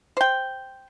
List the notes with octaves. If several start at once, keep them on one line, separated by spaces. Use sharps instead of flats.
C5 G5